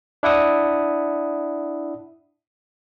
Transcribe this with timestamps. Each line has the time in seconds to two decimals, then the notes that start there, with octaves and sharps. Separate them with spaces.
0.23 D4 E4 F#5 D#6